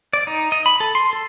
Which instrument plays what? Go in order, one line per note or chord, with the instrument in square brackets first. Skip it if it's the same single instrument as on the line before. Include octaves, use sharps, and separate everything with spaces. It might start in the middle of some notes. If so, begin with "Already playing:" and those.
[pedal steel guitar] D5
D#4
D#5
B5
A4
C6
A4